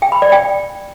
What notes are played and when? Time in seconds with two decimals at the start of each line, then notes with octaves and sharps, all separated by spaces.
0.02 G5
0.12 B5
0.22 D5
0.32 G5